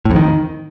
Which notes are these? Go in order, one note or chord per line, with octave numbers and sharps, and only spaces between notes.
A2
F2
D#3